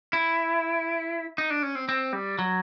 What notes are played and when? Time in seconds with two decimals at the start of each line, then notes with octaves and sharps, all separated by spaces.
0.13 E4
1.38 D#4
1.50 D4
1.63 C#4
1.75 C4
1.89 C4
2.13 G3
2.39 F#3